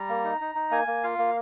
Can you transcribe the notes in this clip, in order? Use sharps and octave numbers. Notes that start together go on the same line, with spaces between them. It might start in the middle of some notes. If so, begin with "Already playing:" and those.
Already playing: G3 A#5
A#3
D#4
D#4
D#4
A#3 G#5
A#3
F4 F5
A#3